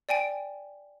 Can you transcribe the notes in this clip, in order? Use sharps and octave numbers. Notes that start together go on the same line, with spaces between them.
D5 G5 G#5 D7